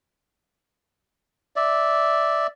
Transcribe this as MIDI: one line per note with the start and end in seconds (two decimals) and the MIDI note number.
1.56 2.47 74
1.56 2.47 76